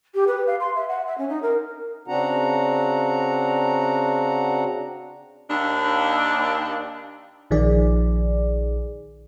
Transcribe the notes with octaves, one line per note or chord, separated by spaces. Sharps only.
G4
B4
F5
C6
E5
F#5
E5
C#4
D#4
A#4
C#3 C4 D4 F#4 F#5 A#5
D#2 D4
A#1 D#3 F3 G#4 D5